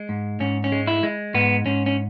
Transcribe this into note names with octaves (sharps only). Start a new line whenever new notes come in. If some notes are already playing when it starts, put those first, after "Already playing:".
Already playing: G#3
G#2
G#2 C#4
C#4
G#3
E4
G#3
G#2 B3
G#2 C#4
C#4